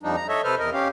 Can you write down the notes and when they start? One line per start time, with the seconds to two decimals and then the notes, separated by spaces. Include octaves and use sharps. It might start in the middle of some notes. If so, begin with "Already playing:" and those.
0.03 F2 F3 G3 D4 D#4
0.16 A#5
0.29 A4 C#5 D#5 E5
0.44 C3 A4 B4 C5 F6
0.59 E2 A#4 D#5
0.73 C#4 G4 F5